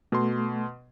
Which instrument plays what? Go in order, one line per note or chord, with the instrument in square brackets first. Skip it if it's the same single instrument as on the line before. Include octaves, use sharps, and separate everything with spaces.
[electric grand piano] B2 C6 [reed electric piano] A3